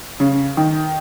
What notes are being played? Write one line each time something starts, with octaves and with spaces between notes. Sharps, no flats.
C#3
D#3